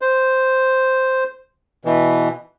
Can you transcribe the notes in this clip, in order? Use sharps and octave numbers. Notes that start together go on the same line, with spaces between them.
C5
B2 E3